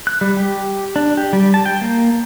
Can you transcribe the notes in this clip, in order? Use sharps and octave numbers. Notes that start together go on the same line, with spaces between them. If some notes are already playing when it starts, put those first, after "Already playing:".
F#6
G3
G4
D4
G4
G3
A5
G5
A#3